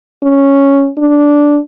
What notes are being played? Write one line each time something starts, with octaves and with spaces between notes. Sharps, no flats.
C#4
D4